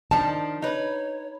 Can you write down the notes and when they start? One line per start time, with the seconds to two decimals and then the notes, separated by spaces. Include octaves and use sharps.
0.11 D#3 F3 D4 A5
0.62 D#4 B4 C#5